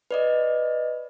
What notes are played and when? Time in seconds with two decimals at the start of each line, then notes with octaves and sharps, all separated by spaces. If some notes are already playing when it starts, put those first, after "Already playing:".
0.11 B4 D5 D#5